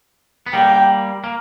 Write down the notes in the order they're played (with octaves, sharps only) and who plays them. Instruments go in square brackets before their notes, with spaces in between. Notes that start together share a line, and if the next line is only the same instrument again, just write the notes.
[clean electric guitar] B3
[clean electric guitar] G3 A#3 [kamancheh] G5
[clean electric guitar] A#3